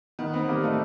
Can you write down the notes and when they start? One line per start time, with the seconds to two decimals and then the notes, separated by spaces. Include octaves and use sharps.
0.19 D#3 B3
0.33 B3 C4
0.48 G3 A#3
0.63 A3 D#4